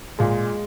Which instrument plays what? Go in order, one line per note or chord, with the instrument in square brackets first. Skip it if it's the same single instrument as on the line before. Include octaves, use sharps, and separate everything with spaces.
[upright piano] A#2 G#3